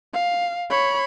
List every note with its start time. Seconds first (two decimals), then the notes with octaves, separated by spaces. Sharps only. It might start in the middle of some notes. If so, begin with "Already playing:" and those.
0.14 F5
0.71 C#5 B5